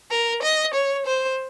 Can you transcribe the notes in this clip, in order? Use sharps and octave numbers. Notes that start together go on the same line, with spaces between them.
A#4
D#5
C#5
C5